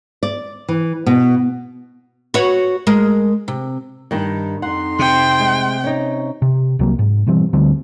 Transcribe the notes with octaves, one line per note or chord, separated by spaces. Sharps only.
D5
E3
B2
F#4 B4 C#5
G#3 A#4
C3
G2 D#3
F2 D#4 F#5 C6
C3 G5
G#3
C#4 D#4
C3
C2 C3 F#3 A#3
G#2
B2 E3 G3 C4
D2 D3 G3 C4